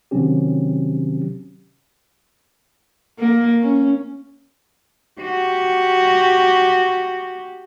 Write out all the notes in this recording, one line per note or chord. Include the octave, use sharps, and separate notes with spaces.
C3 D#3 F#3 C4 C#4 G4
A#3
C#4
F#4 G4